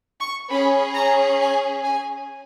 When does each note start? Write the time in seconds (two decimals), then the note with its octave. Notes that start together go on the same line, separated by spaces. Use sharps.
0.21 C#6
0.50 C#4 G#4 B5
0.95 A#5
1.39 G#5
1.84 G#5